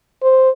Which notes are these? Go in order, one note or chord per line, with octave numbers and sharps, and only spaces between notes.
C5